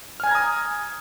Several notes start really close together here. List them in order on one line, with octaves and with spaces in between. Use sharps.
F6 G#5 G#6 A#5 D#6